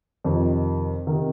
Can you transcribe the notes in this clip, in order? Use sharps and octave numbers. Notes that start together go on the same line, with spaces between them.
F2 C3 D#3
C3 D#3